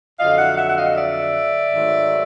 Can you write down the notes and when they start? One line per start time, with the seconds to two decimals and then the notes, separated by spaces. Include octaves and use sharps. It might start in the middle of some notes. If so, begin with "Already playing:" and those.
0.19 F2 D3 F#3 D#5 F5
0.38 E5 F#5
0.57 E5 F#5
0.69 F#5
0.76 D#5 F5
0.95 D5 E5
1.71 G#2 D#3 F#3 A3